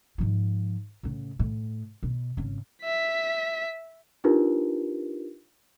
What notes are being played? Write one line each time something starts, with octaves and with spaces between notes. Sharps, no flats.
G#2 F3
A2 C#3
A2
B2
G#1 C#3
E5 B6
D4 D#4 F4 G4 A#4 B4